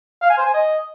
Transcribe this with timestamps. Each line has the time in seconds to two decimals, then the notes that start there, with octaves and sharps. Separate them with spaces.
0.22 F5
0.30 G#5
0.38 C5
0.45 G#5
0.53 D#5